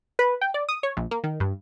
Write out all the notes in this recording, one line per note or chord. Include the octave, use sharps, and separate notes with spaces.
B4
G5
D5
D#6
C#5
A#1
A#3
D#3
G2